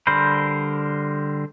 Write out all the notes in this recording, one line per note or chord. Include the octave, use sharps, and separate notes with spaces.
D3 G3 A#4 C5 B5